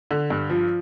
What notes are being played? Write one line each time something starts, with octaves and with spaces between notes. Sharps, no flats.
D3
G2
F3